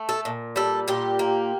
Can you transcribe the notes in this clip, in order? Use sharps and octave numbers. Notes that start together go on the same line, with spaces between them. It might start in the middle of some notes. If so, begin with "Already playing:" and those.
Already playing: A3
A4
A#2
G3 A4
A#2 G4
A#3